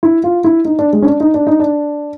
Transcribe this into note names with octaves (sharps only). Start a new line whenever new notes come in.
E4
F4
E4
D#4
D4
G#3
C#4
D4
D#4
D4
D#4
D4